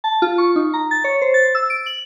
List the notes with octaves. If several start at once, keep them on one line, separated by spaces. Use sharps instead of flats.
A5
F4
C#6
D#4
A#5
A6
C#5
C5
A6
E6
D7
F#7